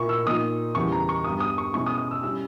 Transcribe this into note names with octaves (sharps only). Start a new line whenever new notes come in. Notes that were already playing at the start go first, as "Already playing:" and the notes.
Already playing: A#2 A#3 E4 C#6
E6
A#2 A#3 D#4 D#6
E2 C#3 E3 G3 C#6
A#5
C#6
G2 G3 B3 D#6
D#6
C#6
B2 G#3 C#4 E4 C#6
D#6
D#6
E6
G3 C#4 E4 E6